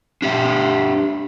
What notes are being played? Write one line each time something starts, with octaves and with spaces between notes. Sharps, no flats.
D4 G4 E5